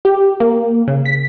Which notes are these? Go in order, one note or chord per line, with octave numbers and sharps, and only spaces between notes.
G4
A#3
C#3
B6